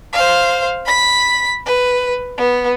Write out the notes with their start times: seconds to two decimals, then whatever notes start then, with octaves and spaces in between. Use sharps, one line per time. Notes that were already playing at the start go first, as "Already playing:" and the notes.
0.13 C5 F5
0.86 B5 B6
1.66 B4
2.37 B3